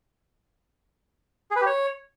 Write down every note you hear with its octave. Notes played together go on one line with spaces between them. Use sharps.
G#4
B4
G4
C#5